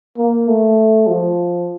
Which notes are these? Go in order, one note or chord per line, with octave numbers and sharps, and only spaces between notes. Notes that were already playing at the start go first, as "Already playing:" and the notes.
A#3
A3
F3